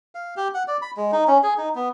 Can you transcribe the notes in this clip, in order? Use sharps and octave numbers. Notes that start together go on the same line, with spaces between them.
F5
G4
F#5
D5
B5
G#3
D#4
C#4
G#4
D#4
B3